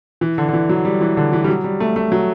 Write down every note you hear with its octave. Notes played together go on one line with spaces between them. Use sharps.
E3
D3
D3
E3
F#3
G3
E3
D3
E3
G3
F#3
G3
A3
A3
F#3